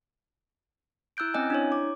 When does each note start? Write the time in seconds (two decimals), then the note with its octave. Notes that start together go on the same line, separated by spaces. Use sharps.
1.17 E4 E6 F#6 G6 D7
1.34 C4 C#4 D#5 G#5
1.50 D4 E4 C#5
1.72 D6